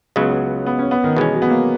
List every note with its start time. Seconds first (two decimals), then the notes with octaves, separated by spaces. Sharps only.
0.16 C#2 C#3 F#3 B3
0.66 B3
0.79 C#4
0.91 B3
1.04 D#3
1.16 B2 E3 G#3 C#4
1.33 F#3
1.42 B3
1.50 A#3